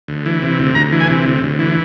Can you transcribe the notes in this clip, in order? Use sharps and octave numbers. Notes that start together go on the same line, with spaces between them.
D2
E3
C3
D2
D2 A#5
E3
G#5
C3
D2
D2
E3